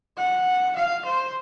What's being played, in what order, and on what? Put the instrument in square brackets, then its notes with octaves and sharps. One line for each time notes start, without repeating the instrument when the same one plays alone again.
[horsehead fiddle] F#5
F5
C5